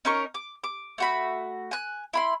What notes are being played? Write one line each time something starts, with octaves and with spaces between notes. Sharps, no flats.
C#4 D#4 A#4 C#6
D6
D6
A3 F#4 B5
G#5 F#6
E4 B5 C6